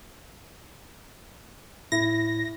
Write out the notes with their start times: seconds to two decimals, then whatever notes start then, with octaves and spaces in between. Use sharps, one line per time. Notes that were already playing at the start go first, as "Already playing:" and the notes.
1.92 A2 E4 A#6